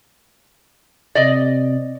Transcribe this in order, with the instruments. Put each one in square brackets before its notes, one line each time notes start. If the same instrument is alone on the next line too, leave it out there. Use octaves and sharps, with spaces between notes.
[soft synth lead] C3 [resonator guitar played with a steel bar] D5 D#5